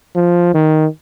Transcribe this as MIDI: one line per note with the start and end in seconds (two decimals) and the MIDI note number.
0.16 0.54 53
0.55 0.86 51